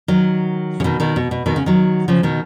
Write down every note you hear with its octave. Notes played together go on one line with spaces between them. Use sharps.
D#3 F#3
C#3
B2 D#3
B2 D#3
B2
B2
B2 D#3
C#3
D#3 F#3
C#3 F3
B2 D#3